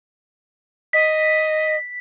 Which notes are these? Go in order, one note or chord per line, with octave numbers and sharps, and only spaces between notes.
D#5 B6